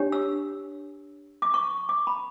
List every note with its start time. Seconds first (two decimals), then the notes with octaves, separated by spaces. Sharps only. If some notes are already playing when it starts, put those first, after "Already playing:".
Already playing: D4 G4 C#5
0.12 E6
1.42 D6
1.54 C#6
1.89 D6
2.07 B5